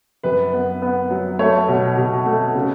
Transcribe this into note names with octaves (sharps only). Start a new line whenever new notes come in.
F#2 B4
B3
B3
F#3
A3 C#5
B2
B2
A3
C#3